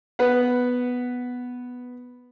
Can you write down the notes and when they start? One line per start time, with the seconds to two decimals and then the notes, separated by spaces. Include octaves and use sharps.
0.19 B3 B4 F#5